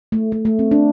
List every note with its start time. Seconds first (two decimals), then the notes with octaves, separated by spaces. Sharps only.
0.12 A3
0.32 A3
0.45 A3
0.59 C4
0.71 D4